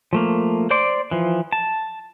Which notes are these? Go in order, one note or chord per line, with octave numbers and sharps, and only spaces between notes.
F3 A3 A#3
C5 D5 C6 D6
E3 F3
A5